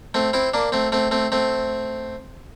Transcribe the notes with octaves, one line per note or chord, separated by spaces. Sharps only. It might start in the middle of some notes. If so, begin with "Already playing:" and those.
A3 C4
C4 E4
A#3 D4
A3 C4
A3 C4
A3 C4
A3 C4